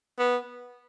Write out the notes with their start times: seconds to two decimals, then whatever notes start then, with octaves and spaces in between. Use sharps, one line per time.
0.19 B3